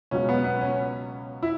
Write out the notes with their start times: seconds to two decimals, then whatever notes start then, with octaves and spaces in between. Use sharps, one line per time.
0.11 C#2 B2 F#3 C#4
0.29 B3
0.44 B3
0.61 C#4
1.43 E4